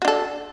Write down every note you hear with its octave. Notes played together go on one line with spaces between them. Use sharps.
D4 F#4 A4